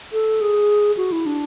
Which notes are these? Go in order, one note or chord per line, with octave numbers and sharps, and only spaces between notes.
A4
G#4
F#4
E4
D4